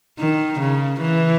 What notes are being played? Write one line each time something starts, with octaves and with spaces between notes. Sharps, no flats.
D#3
C#3
E3